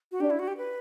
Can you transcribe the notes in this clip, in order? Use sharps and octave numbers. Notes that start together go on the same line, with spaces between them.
F#4
D4 G4
E4
F#4
G4
B4